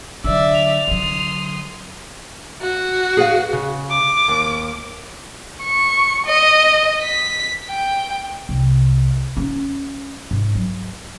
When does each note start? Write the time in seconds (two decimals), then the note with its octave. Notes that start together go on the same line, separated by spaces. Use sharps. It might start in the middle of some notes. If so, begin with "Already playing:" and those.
0.24 D3 F#3 D5 E5 E6
0.54 F7
0.88 D3 F#3 C6 D#6
2.61 F#4
3.17 G#4 B4 F5
3.53 C#3
3.90 D6
4.28 D#2
5.63 C#6
6.27 D#5
7.02 B6
7.70 G5
8.49 C2
9.37 C#4
10.31 G#2
10.55 F#3